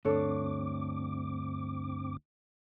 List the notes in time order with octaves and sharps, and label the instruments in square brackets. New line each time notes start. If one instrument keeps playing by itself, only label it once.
[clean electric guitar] D2 [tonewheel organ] G2 C4 D6 [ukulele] D4 A4 C#5